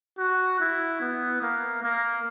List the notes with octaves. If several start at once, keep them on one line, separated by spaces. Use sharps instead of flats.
F#4
E4
B3
A#3
A#3